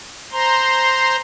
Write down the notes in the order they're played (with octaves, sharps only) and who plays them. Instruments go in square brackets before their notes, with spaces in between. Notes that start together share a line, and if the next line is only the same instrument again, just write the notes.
[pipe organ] C5 A#5 C6